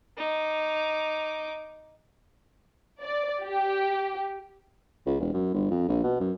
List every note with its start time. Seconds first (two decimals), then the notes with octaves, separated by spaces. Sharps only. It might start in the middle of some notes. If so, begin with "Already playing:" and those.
0.17 D#4 D6
3.02 D5
3.44 G4
5.06 C#2
5.20 E1
5.34 F#2
5.54 G1
5.71 F2
5.89 A#1
6.04 B2
6.20 F#2